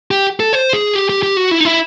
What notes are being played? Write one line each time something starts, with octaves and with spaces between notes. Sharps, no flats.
G4
A4
C5
G#4
G4
G4
G4
F#4
E4
D#4
E4